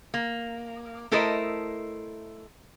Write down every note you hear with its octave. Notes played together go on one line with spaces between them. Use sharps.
A#3
A3 E4 A4 A#4 C5 D#5